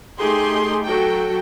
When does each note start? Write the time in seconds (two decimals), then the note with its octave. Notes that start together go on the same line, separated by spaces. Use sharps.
0.19 A3 D#4 G4 G#4 C6
0.85 F#3 F#4 A4 G5